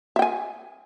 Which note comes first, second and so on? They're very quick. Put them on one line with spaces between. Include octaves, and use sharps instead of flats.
E5 G5 G#5